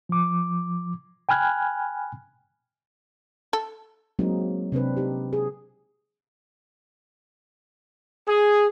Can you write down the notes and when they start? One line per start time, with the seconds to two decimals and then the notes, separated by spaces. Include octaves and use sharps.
0.09 F3 D6
1.29 G5 G#5 B5 F6 F#6 G#6
3.53 A4
4.19 F#3 G#3 A#3 C4 D#4
4.72 C3 C4 D4 B4
4.97 D#4 G4
5.33 G#4
8.28 G#4